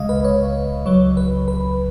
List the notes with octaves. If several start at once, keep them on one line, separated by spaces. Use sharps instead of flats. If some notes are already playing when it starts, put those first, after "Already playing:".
Already playing: C#2 C#3 G#3 D#5 F5
B4
C#5
C#2 C#3 F#3 C#5
B4
B4